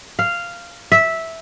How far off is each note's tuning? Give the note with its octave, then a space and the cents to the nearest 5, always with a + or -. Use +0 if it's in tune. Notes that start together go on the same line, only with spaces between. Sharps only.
F5 -10
E5 -10